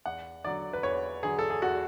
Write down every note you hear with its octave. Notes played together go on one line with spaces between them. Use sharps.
E2 F#5
D3 F#3 D5
B4
E2 C#5
D3 F#3 G#4
A4
G#4
E2 F#4